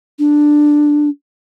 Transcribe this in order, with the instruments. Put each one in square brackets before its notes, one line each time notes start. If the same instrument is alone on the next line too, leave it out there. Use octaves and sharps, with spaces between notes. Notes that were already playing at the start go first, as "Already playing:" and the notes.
[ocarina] D4